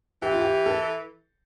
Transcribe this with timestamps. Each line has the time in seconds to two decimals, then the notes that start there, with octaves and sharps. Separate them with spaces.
0.22 E3 G4
0.31 F4
0.41 G4
0.66 A4